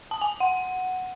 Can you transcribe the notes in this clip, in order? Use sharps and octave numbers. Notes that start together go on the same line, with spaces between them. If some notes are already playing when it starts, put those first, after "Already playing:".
A5
G#5
F#5